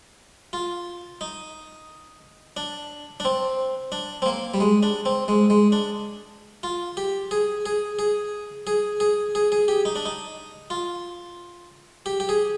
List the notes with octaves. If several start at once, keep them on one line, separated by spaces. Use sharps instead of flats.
F4
D#4
D4
D4
C4
D4
C4
A#3
G3
G#3
D4
C4
G#3
G#3
D4
F4
G4
G#4
G#4
G#4
G#4
G#4
G#4
G#4
G4
D#4
D4
D#4
F4
G4
G4
G#4